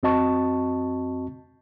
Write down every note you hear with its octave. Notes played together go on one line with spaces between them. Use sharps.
F2 C4 F#4 D#5 A5 C#6